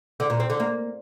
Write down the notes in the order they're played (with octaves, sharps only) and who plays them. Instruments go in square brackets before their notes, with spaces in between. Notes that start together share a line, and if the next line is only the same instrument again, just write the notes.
[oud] D3
A#2
C4
D3
A#3